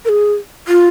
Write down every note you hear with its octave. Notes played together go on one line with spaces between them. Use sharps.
A#4
G#4
F4